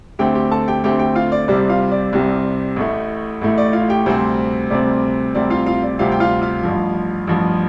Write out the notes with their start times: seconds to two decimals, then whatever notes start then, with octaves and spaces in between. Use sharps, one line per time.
0.19 D2 D3 A3 C4 G4 G5
0.35 G4 G5
0.51 A4 A5
0.68 G4 G5
0.84 D2 D3 A3 C4 G4 G5
0.99 G4 G5
1.15 F4 F5
1.32 D5
1.48 C2 C3 G3 C4 D5
1.69 F4 F5
1.92 D5
2.13 C2 C3 G3 C4
2.77 A1 A2 A3
3.41 A1 A2 A3
3.58 D5
3.73 F4 F5
3.90 G4 G5
4.06 D2 C3 G3 C4 C5
4.70 D2 C3 G3 C4 D5
5.35 D2 C3 G3 C4 D5
5.50 F4 F5
5.66 F4 F5
5.83 D5
5.99 D2 C3 G3 C4 F4 F5
6.12 G5
6.20 F4 F5
6.42 F4 F5
6.63 A1 G2 F3
7.27 A1 G2 F3